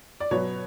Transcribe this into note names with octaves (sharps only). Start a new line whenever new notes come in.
D5
B2 F#3 B3 C#5